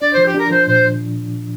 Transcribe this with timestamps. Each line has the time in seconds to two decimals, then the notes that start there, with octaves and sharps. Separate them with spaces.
0.01 D4 D5
0.13 F3 C5
0.26 G4
0.34 D4 A#4
0.51 F3 C5
0.67 A#2 C5